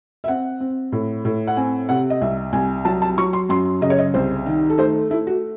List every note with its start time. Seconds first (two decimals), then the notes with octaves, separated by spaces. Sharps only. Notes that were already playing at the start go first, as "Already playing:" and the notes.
0.24 E5
0.28 C4 F#5
0.60 C4
0.92 A2
1.25 A2
1.47 F#5
1.57 C4 G#5
1.89 C3 F#5
2.10 D#5
2.21 C2 E5
2.53 C2 G#5
2.85 F#3 A5
3.02 A5
3.18 F#3 C#6
3.33 C6
3.49 F#2 C6
3.81 C#3 D#5
3.90 C#5
3.99 D#5
4.14 C2 C5
4.46 D#3
4.70 A4
4.78 A3 C5
5.10 A3 E4
5.27 F#4